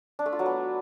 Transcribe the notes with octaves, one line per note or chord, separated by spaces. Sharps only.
D4
A3
F4
F#3
B3